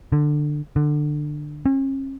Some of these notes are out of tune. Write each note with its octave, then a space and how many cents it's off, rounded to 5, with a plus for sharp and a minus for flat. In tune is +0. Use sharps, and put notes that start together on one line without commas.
D3 +15
D3 +20
C#4 -40